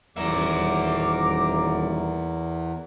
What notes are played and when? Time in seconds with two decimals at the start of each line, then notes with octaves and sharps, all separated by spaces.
0.17 D#1 E2 A#4 E5 D6